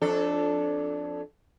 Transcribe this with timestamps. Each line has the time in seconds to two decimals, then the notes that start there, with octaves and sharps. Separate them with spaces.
0.01 F2 D4 A4